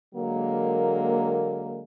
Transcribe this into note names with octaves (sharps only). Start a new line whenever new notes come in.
D3 F#3 G#3 A#3